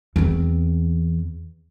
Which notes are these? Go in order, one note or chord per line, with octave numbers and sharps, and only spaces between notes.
E2 C4